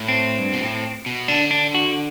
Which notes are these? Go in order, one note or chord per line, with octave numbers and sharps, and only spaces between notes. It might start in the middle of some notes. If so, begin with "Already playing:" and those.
Already playing: A2
C4
G2
B2
A2
B2
D3 D4
D4
F#4